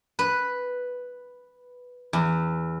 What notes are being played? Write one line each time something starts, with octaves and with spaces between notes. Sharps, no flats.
B4
E2